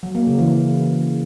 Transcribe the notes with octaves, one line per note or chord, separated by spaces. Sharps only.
F#3
A#3
C#3
E3